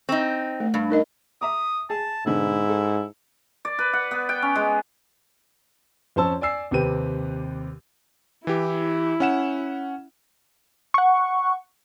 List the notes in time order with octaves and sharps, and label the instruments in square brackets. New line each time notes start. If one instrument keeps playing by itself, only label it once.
[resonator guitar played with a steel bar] C4 D#4 [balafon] C#6
[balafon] A3
[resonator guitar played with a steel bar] G2
[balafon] D#4 A#4 D#5
[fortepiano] E5 A#5 D6 [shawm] D#6
[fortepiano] G#4 [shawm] A5
[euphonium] G#2 [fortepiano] B2 D3 B3 [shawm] E4
[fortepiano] A4
[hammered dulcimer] D5
B4
F#5
B3
G5
C#4
G#3
[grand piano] F2 C#4 C5 A5 E6
D5 G#5 E6 C7
D#2 C3 C4 G4 B4 D#7
[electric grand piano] E3 G4 [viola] E4
[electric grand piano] C#4 F#5 E7
[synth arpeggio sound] F#5 C#6